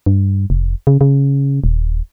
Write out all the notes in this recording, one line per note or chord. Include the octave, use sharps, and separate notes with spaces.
G2
F1
C#3
C#3
D#1